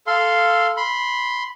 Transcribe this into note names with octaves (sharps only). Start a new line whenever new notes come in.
A4 F5 C6
B5 C6